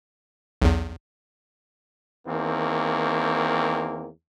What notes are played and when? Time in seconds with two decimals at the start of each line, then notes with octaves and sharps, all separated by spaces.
0.62 B1 E2
2.27 E2 D#3 A#3 C4